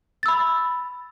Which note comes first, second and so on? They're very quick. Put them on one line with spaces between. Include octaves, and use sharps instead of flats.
A6 E6 B5